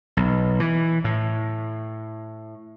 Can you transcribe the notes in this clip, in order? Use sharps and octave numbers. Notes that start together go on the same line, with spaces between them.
B1
E3
A2